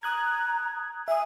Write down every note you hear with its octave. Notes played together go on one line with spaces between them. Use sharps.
A#5 D#6 F#6 G#6
E5 G#5 D#6